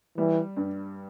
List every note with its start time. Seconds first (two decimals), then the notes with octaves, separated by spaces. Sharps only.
0.18 E3 G3
0.57 G2